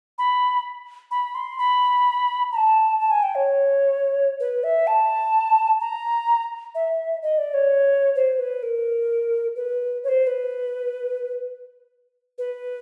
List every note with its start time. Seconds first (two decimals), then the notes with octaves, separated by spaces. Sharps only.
0.18 B5
1.11 B5
1.35 C6
1.59 B5
2.52 A#5
2.57 A5
3.00 A5
3.11 G#5
3.23 G5
3.35 C#5
4.40 B4
4.64 E5
4.87 A5
5.80 A#5
6.75 E5
7.22 D#5
7.38 D5
7.54 C#5
8.15 C5
8.39 B4
8.63 A#4
9.56 B4
10.04 C#5
10.09 C5
10.27 B4
12.38 B4